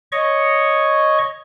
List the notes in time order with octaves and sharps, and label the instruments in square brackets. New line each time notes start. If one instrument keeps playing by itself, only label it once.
[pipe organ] C#5 D#5 C#6